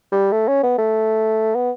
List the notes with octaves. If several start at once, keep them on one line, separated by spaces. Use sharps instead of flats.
G3
A3
C#4
B3
A3
B3